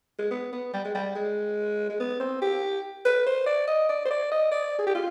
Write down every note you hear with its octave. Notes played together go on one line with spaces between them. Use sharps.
G#3
B3
B3
G3
G#3
G3
G#3
G#3
B3
C4
G4
B4
C5
D5
D#5
D5
C5
D5
D#5
D5
G#4
G4
F4